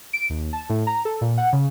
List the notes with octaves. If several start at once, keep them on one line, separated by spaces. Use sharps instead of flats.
D7
D#2
A5
A2
A#5
A4
A#2
F#5
C#3